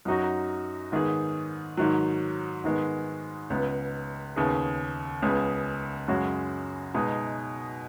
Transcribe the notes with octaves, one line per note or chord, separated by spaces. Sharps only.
F#2 F#3 D#4 F#4
G#2 D#3 B3 G#4
G#2 D#3 F#3
G#2 D#3 G#3 B3
C#2 C#3 B3
D#2 C#3 B3 G#4
C#2 C#3 B3 G#4
F#2 C#3 G#3 C#4 F#4
B2 G#3 D#4 G#4